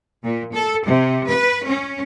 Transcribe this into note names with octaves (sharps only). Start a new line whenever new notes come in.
A#2
A4
C3
B4
C#4